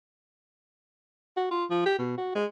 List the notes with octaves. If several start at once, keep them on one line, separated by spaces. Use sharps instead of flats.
F#4
F4
F3
G4
B2
F#4
G#3